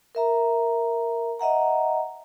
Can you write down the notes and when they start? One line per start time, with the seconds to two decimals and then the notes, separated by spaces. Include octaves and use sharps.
0.15 A#4 E5 A#5
1.40 D#5 E5 F#5 A#5